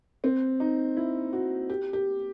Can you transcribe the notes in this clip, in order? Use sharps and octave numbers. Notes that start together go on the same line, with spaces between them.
C4
D#4
E4
F#4
G4
G4